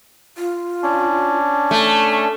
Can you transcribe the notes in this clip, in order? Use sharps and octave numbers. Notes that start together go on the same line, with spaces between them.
F4
C#4 D4
A3 A5